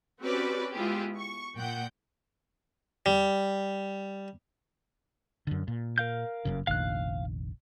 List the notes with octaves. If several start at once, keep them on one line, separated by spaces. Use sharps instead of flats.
C4 C#4 F#4 G4 B4 D5
G#3 B3 E4 F4 G4 G#4
C#6
A#2 F#5 G5 G6
G3
F#2 D3
A#2
A#4 F5 G6
F#1 F#2 C#3
F1 A#1 D#3 F5 F#6